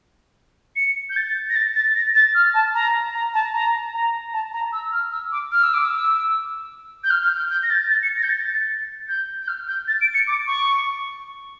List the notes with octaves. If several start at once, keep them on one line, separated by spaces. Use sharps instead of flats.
C#7
G6
A6
A#6
A6
A6
A#6
A6
F6
A5
A#5
A#5
A5
A#5
A#5
A5
A#5
E6
F6
E6
D6
F6
E6
D6
E6
G6
F6
F6
G6
G6
A#6
A6
A6
C#7
A#6
G6
A6
G6
G6
F6
G6
A6
D7
C#7
D6
C#6